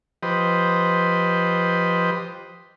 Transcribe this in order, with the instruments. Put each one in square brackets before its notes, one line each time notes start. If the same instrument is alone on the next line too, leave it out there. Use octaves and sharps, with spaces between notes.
[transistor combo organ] F3 G4 B4 C5 D#5